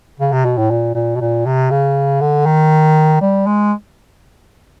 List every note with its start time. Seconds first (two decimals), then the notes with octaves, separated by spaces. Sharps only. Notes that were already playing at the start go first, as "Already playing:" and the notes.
0.20 C#3
0.32 C3
0.45 B2
0.58 A2
0.71 A#2
0.95 A#2
1.16 B2
1.21 A#2
1.46 C3
1.71 C#3
2.21 D3
2.46 D#3
3.21 G3
3.47 G#3